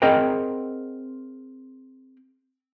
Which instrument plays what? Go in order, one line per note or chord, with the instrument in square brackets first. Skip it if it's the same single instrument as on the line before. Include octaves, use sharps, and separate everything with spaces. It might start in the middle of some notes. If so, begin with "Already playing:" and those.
[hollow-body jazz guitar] C4 G#4 A#4 D#5 F#5 G5